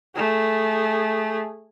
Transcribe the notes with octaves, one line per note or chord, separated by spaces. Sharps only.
A3 G#4